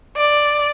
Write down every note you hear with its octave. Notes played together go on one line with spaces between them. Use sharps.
D5